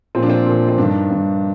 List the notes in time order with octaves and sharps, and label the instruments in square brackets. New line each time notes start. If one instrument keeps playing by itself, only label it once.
[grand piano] A#2 F3 C4
D4
C4
A#2 F3
C4
G2 D#3 D4
G2 D#3